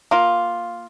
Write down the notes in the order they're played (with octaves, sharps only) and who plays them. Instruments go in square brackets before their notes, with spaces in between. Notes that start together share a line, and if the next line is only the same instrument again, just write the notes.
[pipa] A#3 F4